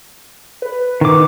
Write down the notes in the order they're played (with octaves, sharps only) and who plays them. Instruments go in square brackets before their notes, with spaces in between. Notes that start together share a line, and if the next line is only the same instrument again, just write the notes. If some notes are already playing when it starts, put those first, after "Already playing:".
[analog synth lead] B4
[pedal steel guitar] D#3 D6